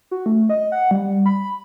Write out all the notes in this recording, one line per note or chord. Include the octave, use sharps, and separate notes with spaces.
F#4
A3
D#5
F#5
G3
B5